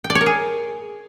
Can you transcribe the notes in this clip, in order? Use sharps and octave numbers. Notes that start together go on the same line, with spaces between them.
G5
D5
C#5
A#4
G#4